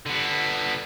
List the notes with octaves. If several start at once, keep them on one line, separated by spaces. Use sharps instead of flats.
D3 B3